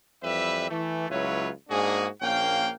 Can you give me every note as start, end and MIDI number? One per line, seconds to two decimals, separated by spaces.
0.23 0.69 41
0.23 0.69 52
0.23 0.69 55
0.23 0.69 71
0.23 0.69 76
0.69 1.07 52
0.69 1.07 57
1.10 1.50 37
1.10 1.50 54
1.10 1.50 64
1.10 1.50 65
1.10 1.50 71
1.10 1.50 73
1.69 2.07 44
1.69 2.07 58
1.69 2.07 62
1.69 2.07 66
1.69 2.07 68
2.22 2.71 34
2.22 2.71 58
2.22 2.71 61
2.22 2.71 77
2.22 2.71 79